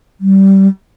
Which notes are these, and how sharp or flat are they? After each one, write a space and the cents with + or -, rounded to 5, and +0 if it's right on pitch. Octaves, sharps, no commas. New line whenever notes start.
G3 -20